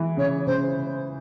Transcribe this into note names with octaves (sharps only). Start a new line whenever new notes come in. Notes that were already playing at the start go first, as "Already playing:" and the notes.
Already playing: E3 G#3
C#3 C#5
C#3 C5